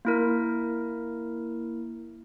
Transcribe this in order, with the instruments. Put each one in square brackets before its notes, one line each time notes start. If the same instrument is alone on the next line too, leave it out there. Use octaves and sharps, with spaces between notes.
[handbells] A#3 E4 A#4